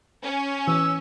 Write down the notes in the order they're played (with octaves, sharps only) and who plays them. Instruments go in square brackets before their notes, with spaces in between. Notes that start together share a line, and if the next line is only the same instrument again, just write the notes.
[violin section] C#4
[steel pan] E3 [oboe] E6